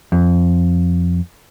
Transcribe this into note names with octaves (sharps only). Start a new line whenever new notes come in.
F2